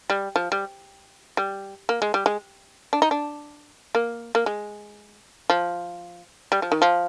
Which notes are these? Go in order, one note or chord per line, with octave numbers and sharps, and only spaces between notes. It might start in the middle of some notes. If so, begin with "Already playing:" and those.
G3
F3
G3
G3
A#3
G#3
G3
G#3
D4
D#4
D4
A#3
A#3
G#3
F3
G3
F3
D#3
F3